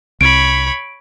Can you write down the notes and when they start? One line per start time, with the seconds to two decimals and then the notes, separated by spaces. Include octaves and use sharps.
0.21 C2 C#5 B5 D7